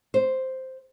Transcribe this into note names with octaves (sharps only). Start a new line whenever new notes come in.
C5